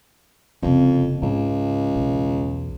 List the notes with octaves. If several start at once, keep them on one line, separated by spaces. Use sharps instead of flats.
F#1 F2 C3
C#2 G#2
B1 E2